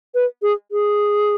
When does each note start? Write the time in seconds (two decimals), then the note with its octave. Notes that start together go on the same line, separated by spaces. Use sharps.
0.15 B4
0.42 G#4
0.72 G#4